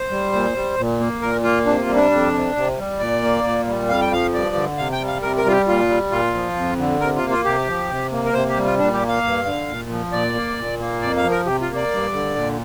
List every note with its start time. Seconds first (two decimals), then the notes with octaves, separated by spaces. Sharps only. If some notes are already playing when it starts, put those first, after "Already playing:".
Already playing: C5
0.10 G3
0.33 A#2
0.54 G3
0.78 A#2
1.00 A#3
1.22 A#2 A#4
1.43 A#3 F4
1.66 C3 D4
1.81 F4
1.88 G3
1.96 D4
2.11 F2
2.33 C3
2.56 C3
2.78 G3
2.99 A#2 D5
3.22 A#3
3.44 A#2
3.66 G3
3.88 F2 F5
4.01 G5
4.11 F3 F5
4.33 G2 D5
4.55 D3
4.78 C3 F5
4.92 G5
5.01 G3
5.07 F5
5.22 C3 A#4
5.38 A#4
5.45 G3 F4
5.52 G4
5.67 A#2 F4
5.89 G3
6.11 A#2 F4
6.34 F3
6.56 F2
6.78 D3
7.00 C3 A#4
7.16 F4
7.23 A#3
7.31 F4
7.45 C3 G4
7.68 F3
7.90 C3
8.12 A#3
8.26 A#4
8.34 C3 C5
8.49 G4
8.57 G3
8.65 F4
8.78 A#2 D4
8.93 G4
9.01 A#3
9.08 F5
9.23 G2
9.45 D3
9.68 A#2
9.90 F3
10.12 A#2 D5
10.35 A#3
10.57 A#2
10.80 A#3
11.02 F2 D5
11.17 F5
11.24 F3
11.31 A#4
11.46 C3 G4
11.61 F4
11.69 A#3
11.76 D5
11.91 G2
12.13 D3
12.36 A#2